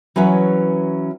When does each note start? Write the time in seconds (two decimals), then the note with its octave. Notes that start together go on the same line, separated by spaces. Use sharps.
0.16 E3 F#3 C#4 B4 E5